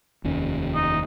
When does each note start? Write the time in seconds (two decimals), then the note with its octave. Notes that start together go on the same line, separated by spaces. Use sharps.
0.24 F1 D#2 C#4
0.75 D#4